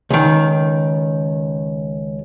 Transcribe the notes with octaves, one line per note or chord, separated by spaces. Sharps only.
C#2 D#3